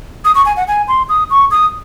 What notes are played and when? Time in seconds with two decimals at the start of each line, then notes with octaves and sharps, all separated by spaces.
0.25 D#6
0.35 C#6
0.46 G#5
0.57 F#5
0.68 G#5
0.88 C6
1.09 D#6
1.30 C#6
1.51 D#6